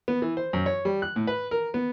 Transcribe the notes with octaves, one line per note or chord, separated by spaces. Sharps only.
B3
E3
C5
F#2
C#5
G3
F#6
A2
B4
A#4
B3